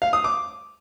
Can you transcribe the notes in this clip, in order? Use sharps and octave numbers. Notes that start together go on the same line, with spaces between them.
F5
D#6
D6